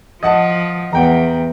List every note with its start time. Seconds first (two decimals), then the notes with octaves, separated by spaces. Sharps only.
0.23 F3 D#5 F#5 A5
0.93 E2 F#5 G5 A#5